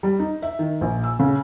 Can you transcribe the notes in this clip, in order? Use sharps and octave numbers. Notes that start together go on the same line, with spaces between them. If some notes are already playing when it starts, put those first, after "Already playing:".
G3
D#4
E5
D#3
A#1
E6
C#3